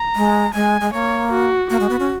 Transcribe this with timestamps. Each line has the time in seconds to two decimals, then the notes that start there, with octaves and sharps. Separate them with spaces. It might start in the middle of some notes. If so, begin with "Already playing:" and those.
Already playing: A#5
0.16 G#3
0.54 G#3 G#5
0.81 G#3
0.93 A#3 C#5
1.32 F#4
1.70 A#3 F#4
1.80 G#3
1.90 B3
2.00 C#4